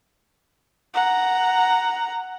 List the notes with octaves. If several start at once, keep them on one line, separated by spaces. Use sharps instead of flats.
F#5 A#5